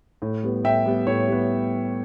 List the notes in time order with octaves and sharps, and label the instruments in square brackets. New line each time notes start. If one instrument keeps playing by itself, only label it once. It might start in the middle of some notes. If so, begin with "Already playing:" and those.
[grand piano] A2
G3 B3
A2 E5 G5
G3 B3
A2 C#5
G3 B3